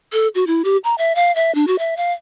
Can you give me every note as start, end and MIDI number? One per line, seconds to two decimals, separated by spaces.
0.13 0.28 69
0.35 0.47 66
0.47 0.62 64
0.64 0.77 67
0.84 0.95 82
0.98 1.15 76
1.15 1.34 77
1.36 1.53 76
1.55 1.65 62
1.67 1.76 66
1.79 1.95 76
1.97 2.12 77